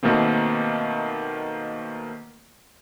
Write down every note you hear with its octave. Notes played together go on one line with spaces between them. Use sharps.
B2 D#3 A3 A#3 C4